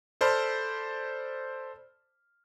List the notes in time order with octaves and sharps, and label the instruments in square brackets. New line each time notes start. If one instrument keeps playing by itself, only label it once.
[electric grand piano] A4 C5 D5 A5 B5 F6